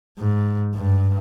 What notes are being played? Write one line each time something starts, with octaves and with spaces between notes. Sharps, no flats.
G#2
G2